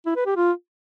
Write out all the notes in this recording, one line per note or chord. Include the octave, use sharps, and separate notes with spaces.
E4
B4
G4
F4